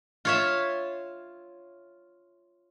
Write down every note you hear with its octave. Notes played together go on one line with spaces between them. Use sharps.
F4 C#5 E5